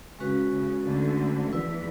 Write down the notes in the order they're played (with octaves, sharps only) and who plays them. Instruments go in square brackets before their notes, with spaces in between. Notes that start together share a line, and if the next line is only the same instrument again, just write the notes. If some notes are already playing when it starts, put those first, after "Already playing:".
[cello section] C#3 [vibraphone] G#3 C#4 F#4 B4
[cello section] C#3
D2 D3
[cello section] E2 E3 [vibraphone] E4 B4 D5